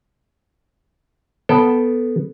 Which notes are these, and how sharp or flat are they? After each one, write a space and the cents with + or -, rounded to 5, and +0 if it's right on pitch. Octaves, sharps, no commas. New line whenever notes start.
B3 +0 A4 +0 G5 +0